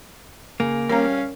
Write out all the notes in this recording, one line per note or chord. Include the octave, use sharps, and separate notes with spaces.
C#3 A#3
G3 C#4 A#4 F5 A#5